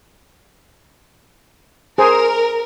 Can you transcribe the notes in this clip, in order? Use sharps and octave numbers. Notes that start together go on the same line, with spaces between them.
G#4 A#4 C5